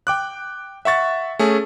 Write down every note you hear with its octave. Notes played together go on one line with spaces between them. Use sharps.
G5 D6 F#6
E5 F#5 C#6 A6
A3 C#4 G#4